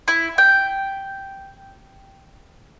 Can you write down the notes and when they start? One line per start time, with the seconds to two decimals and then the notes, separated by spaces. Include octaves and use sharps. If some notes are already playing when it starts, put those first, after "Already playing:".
0.08 E4
0.38 G5